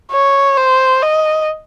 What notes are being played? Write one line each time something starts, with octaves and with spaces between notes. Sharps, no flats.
C#5
C5
D#5